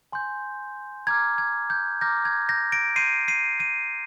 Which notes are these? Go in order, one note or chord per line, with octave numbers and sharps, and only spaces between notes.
G#5 C6 G6
A#5 D6 F6 G#6
G#6
G6
A#5 D6 F6 G6 A#6
G#6
G6 A#6
A#6 D7
C6 G6 C7 D#7
C7 D#7
C7 D#7